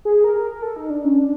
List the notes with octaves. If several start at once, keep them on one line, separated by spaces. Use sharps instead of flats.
G#4
A#4
A#4
A4
D#4
D4
C#4
D4